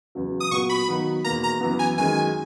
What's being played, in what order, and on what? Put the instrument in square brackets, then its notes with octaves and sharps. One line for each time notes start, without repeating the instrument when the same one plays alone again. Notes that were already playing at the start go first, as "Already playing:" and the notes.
[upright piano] E2 C#3 F#3
[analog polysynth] D#6
[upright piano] A#2 F#3 B3 F#4 [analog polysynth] C#6
[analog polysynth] B5
[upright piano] D#3 F#3 B3 D#4
[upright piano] E2 B2 A#3 [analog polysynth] A#5
[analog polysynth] A#5
[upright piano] F#2 E3 B3
[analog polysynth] G#5
[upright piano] F#2 D#3 G#3 [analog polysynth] G#5